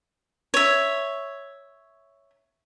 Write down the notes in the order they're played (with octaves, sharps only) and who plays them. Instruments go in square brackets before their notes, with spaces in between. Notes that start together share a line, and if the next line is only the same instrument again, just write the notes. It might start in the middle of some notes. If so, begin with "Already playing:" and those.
[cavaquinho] C#5 E5